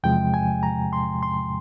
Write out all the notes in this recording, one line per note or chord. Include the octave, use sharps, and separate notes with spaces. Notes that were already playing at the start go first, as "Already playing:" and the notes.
E2 C3 F3 G#3 G5
G#5
A#5
C6
C6